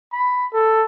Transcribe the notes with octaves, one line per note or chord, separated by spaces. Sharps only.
B5
A4